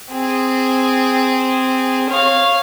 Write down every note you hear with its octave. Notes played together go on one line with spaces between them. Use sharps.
C4 G#4
C#5 F5